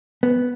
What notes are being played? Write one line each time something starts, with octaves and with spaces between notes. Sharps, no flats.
B3